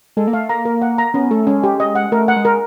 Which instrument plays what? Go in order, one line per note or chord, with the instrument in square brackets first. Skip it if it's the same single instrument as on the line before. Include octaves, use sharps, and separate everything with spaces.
[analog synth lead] G#3 [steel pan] A4
[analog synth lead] A#3
[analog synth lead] A3 [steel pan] F5
[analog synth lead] A#3 [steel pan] A#5
[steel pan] A#4
F#5
A#5
[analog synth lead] B3 [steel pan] C#4
[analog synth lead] A3 [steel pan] A4
[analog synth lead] G#3 [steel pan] C#4
[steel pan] G4
D#5
F#5
[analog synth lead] A3 [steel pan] A#4
[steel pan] F#5
[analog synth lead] G#3
[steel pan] A#4